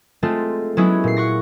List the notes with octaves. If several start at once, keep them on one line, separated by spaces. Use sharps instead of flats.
G#3 A3 C4 F4 A4
F#3 G#3 B3 C#4 E4 G#4
A#2 C7
F#5 C#6 A#6